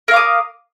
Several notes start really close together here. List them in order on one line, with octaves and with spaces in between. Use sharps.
A#4 F5 D6 D#6